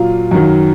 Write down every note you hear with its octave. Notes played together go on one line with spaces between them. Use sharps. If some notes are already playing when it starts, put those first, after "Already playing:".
Already playing: A#2 F#3 F4
F#2 D#3 F#3